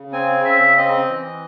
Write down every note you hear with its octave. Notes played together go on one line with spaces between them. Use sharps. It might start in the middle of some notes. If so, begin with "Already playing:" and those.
Already playing: C#3
C4 G#5
C#3 E5
C4 D#5
E3